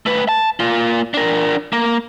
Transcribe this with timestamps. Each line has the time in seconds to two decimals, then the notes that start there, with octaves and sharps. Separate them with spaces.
0.06 A3 B4
0.29 A5
0.60 A#3 F4
1.14 D4 A#4
1.73 A#3